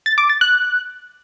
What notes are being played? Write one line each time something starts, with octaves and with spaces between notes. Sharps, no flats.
A6
D6
A6
F#6